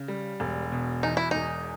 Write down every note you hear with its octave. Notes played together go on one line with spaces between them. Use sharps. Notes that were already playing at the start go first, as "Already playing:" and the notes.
Already playing: C#3
G3
E1
B2
E2 D#4
E4
E1 D#4